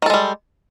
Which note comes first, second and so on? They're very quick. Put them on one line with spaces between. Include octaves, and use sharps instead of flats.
D#3 A4 G#3 G3